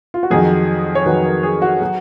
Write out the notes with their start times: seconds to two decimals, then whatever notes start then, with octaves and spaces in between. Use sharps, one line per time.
0.14 F4
0.23 F#4
0.30 F2 D#3 F#3 G#4
0.95 C#5
1.06 F2 D#3 F#3 B4
1.25 A#4
1.43 G#4
1.62 F#4
1.82 F#3